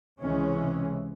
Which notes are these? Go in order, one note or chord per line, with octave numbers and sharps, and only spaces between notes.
C#2 C3 E3 G#3 C#4